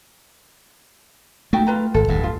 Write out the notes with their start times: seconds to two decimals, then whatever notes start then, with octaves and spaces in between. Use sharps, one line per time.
1.53 A3 D#4 F#4 G5
1.67 F4 B4 A#5
1.94 G#1 A4
2.08 D1 G2
2.24 F4